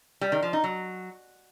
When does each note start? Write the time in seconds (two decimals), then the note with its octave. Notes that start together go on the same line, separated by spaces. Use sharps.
0.21 G3
0.32 D#3
0.43 F3
0.53 D#4
0.64 F#3